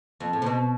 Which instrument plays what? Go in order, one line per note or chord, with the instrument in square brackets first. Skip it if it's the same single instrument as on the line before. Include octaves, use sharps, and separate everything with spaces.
[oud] F2
A2
C3
B2